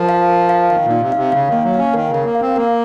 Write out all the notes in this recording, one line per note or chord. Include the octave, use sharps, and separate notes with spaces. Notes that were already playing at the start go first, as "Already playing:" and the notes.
Already playing: F3 A#4
F5
A#4
F5
D#3 F5
A#2
D#4
C3
C3 F5
C#3 F5
D#3 A#3
F#3
C#4 F5
D#3 A#4
C#3
A#4
A#3
F5
C4
A#3 A#4